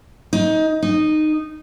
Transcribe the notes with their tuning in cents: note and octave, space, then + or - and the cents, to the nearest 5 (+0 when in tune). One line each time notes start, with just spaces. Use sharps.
D#4 +20
D#4 -15